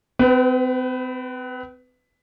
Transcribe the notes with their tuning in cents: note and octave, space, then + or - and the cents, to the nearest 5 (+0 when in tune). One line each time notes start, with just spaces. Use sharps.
C4 -40 B4 +15